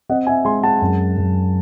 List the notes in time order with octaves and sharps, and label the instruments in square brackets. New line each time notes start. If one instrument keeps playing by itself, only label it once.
[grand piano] C4 D#5 F#5
E5 G#5
G#3 G#5 C6
F#5 A5
F#2
F#2